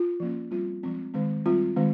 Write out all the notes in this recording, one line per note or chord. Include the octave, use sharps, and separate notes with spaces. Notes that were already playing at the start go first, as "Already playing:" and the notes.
Already playing: F4
F3 A#3 C#4
G3 C4 F4
F3 G#3 C4
D#3 G#3 C4
G3 C4 F4
D#3 G#3 C4